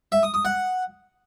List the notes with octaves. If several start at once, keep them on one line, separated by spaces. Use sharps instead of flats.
E5
D#6
D#6
F#5